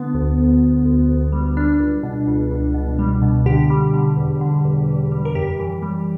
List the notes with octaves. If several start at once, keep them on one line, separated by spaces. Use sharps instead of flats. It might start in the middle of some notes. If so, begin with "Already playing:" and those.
Already playing: D3 B3
D2
D2
D2
D2
D2
G3
G3 D4
C#2
B2
C#2
C#2
B2
G3
B2
D3 G4
G3
D3
E2
D3
E2
E2
G3
A#4
F#2 G4
E3
G3